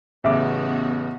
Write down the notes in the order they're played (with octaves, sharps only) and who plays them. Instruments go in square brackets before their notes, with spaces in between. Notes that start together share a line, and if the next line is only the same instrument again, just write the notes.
[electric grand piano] A1 C#3 D6 [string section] B3 F#4 [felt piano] E5